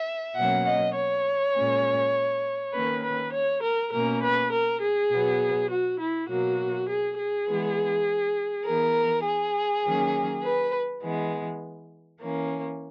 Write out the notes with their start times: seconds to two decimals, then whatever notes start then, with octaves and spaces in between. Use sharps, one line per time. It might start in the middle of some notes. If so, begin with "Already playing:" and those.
Already playing: E5
0.36 B2 F#3 A#3 C#4 F#5
0.66 D#5
0.95 C#5
1.55 A#2 G#3 C#4
2.73 D#3 A#3 C#4 B4
3.02 B4
3.32 C#5
3.62 A#4
3.91 B2 A#3 C#4 A#4
4.21 B4
4.51 A#4
4.80 G#4
5.10 B2 F#3 B3
5.69 F#4
5.99 E4
6.28 B2 F#3 A#3 F#4
6.88 G#4
7.17 G#4
7.46 E3 G#3 B3
8.65 E3 B3 A#4
9.24 G#4
9.84 D#3 F#3 A#3 C#4
10.43 B4
11.02 E3 G#3 B3
12.20 E3 A#3 C#4